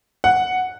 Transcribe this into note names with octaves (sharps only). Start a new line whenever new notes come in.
F#5